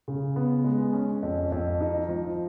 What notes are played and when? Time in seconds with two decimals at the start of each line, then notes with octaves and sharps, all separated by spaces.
0.08 C#3
0.36 B3
0.64 G#3
0.93 C#4
1.23 F2
1.52 F2
1.81 D#4
2.09 F3